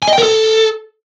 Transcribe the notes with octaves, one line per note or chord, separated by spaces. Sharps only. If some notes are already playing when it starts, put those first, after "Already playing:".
G#5
D#5
G5
A#4
A4